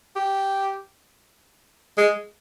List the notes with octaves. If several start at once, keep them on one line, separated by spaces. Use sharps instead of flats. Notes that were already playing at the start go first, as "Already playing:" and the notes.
G4
G#3